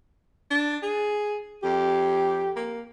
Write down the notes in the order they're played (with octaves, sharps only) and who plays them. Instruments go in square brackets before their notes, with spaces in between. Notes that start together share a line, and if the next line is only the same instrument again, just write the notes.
[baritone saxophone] D4
G#4
[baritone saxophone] F2 [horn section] G4
[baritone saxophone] A#3